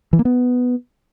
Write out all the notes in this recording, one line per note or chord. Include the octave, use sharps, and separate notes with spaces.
E3
A#3
B3